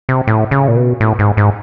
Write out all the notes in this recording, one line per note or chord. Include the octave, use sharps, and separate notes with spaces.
C3
A2
C#3
A#2
B2
A2
G#2
G#2